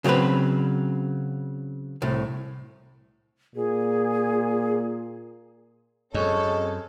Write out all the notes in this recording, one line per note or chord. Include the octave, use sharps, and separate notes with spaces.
C#3 F#3 A3 C4 B4
C2 A2
A#2 G#4
F#2 G#3 C4 A4 C#5